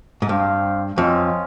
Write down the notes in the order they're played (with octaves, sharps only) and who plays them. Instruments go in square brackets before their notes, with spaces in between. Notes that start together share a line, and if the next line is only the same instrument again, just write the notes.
[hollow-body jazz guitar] G#2
[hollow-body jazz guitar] G2 [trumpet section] C4 G4 C5 F5
[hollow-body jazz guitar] F2 [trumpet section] C#4 F4 C5 D#5